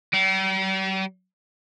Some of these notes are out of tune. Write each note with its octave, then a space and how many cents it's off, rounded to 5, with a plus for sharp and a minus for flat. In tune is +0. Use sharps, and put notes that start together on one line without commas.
G3 -45